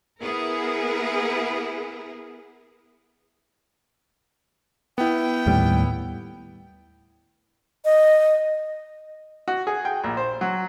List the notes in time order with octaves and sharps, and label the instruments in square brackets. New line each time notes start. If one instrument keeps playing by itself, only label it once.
[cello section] B3 E4 G#4 A#4
[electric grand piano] B3 E4 [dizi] G5
[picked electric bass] D#2 A2 G3
[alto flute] D#5
[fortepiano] F#4
G#4
G5
A#1
C5
F#3